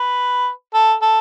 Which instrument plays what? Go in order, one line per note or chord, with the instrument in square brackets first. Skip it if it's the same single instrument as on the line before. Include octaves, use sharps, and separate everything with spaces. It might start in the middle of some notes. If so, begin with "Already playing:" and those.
Already playing: [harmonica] B4
A4
A4